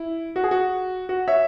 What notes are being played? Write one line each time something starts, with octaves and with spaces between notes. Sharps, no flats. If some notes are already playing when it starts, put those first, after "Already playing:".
Already playing: E4
F#4
G#4
F#4
F#4
C#5 E5